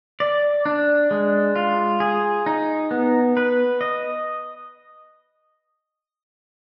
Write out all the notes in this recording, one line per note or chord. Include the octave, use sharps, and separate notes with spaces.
D5
D4
G#3
F4
G#4
D#4
B3
B4
D#5